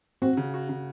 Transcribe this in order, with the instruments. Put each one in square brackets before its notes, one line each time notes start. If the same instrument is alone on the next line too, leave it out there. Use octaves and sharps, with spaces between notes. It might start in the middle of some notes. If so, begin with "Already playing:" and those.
[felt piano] C4 [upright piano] F#4
[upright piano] C#3
F#4
C#3